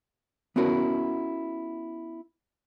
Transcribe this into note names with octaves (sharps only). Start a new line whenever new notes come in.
B3 C#4 E4 F#4 A#4